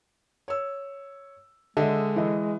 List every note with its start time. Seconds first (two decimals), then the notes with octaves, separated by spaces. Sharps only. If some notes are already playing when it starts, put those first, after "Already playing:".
0.48 C#5 E6
1.77 D3 G#3 D#5 E5
2.16 E3 D#5